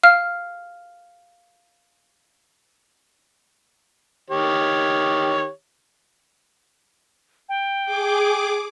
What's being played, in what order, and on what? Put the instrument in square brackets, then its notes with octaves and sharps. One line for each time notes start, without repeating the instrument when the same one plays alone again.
[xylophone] F5 F6
[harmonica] D#3 G4 C#5
[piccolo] G5
[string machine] G#4 D6